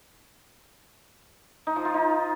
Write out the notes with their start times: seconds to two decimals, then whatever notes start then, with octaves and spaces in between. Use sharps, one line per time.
1.67 D#4
1.76 F3
1.85 F4
1.94 D#4